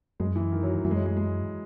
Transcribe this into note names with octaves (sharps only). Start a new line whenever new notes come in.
F#2 G#3
E3
D#3
F#3
F#3
F#2 E3
G#3
F#3
G#3
G#3